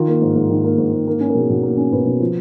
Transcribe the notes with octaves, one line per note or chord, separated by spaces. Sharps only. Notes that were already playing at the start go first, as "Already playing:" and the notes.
Already playing: D#3 F4
A#3
G#2
G#2
D#3
A#3
G#2
G#2
A#3
C#4
A#4
B2 G#4
B2
A#3
C#4
B2 B4
B2
F3